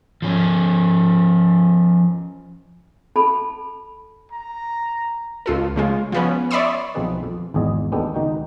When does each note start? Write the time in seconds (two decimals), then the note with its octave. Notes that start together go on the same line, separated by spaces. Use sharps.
0.22 F3 C#4
3.16 A4 A5 B5
4.32 A#5
5.46 C#2 F4 A4
5.76 C#3 G#3 F4
6.12 F3 B3 C#4
6.51 C#5 D5 E5 B5 C6 D#6
6.94 B1 F3 C4 G#4 B4 D#5
7.23 F2
7.54 G#1 E2 G#4 D5 D#5
7.92 D#2 G#3 B3 D4 G4 A4
8.14 C#2 D#3 D#4 F#4 G5